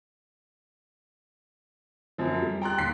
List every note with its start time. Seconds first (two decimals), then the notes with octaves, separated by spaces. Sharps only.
2.18 F#2 F3
2.42 G3
2.62 G5 A#5 C6 F#6
2.78 D#2 B6 C7